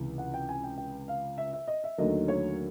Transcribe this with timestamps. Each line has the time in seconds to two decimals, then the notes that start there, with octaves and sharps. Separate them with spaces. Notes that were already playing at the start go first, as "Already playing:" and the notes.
Already playing: C#2 C3 E3
0.18 F#5
0.34 G5
0.49 G#5
0.64 G5
0.78 G5
1.08 F5
1.38 E5
1.53 E5
1.68 D#5
1.84 E5
1.98 D#2 D3 F#3 A3 D#5
2.28 C#5